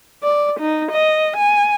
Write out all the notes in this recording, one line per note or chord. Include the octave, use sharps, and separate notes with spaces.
D5
D#4
D#5
G#5